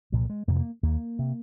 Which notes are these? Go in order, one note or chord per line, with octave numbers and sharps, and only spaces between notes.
C2 A#2 F3
G#3
F2 C3 A#3
G#3
A#3
D#2 A#3
C3